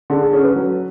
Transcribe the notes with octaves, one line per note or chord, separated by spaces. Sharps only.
D3 G#4
G#4
C#4 A4
B4
F#3